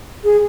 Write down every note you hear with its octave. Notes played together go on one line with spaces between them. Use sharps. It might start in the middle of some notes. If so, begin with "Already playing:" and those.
G#4